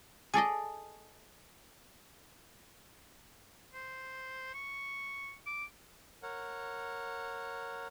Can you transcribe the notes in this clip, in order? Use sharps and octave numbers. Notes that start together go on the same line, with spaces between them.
G#4 A4 D5 D#5
C5
C#6
D6
A#4 C#5 F#5